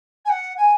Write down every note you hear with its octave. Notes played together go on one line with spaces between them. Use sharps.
G#5
F#5
G#5